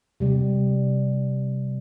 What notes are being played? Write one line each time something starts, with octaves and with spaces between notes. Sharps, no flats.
C3 G3